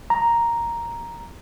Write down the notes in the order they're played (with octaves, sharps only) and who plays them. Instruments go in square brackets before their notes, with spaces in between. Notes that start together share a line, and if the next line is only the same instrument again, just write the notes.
[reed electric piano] A#5